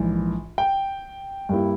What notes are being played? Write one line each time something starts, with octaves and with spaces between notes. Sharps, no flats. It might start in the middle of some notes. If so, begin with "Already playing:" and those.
Already playing: A#1 G#2 E3
G5
G2 G3 A#3 E4